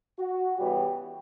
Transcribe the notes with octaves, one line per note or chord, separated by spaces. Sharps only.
F#4
C#3 E3 G3 B3 G4